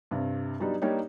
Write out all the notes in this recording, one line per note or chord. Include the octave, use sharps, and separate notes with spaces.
G2 C3
F#3 G3 B3 D4 D#4
G3 A#3 D4 D#4 G4 C#5